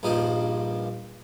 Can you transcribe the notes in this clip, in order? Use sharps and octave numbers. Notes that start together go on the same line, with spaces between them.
A#1 G2 F3 D#4 C5